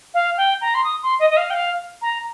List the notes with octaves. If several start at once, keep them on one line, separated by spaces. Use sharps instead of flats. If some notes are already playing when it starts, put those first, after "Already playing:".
F5
G5
A#5
C6
D#6
C6
D#5
D#5
F5
G5
F5
A#5